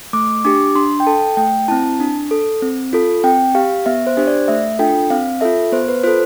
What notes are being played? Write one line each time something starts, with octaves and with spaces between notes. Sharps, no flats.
A3 D6
D4 G4 D6
D4 C6
G5
A4 A5
A3 G5
C4 E4 A5
D4
A4
C4
F4 A4
C4 G5
G4 F5
B3 E5
C5
D4 G4 C5
D5
A3 E5
D4 F4 A4 G5
C4 F5
F4 A4 E5
B3 C5
B4
F4 A4 C5